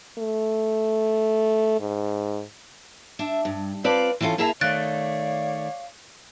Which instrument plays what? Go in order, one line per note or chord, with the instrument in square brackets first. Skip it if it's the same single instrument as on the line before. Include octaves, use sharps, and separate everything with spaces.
[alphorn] A3
G#2
[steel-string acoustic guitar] D4 E5
G2
C4 F4 B4 D5 F5 A5
E3 C4 C#4 F4 A4
A#3 E4 G#4 E5 A5 A#5
[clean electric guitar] D#3 A3 [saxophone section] C#5 D5 [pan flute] F5 [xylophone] F#6 A6 D7